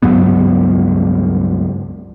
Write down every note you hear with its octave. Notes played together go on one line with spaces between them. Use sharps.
C#2 G2 F#3 B3